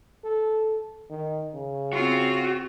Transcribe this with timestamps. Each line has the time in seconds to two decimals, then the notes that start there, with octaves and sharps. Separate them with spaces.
0.24 A4
1.10 D#3
1.54 C#3
1.93 C4 F4 F#4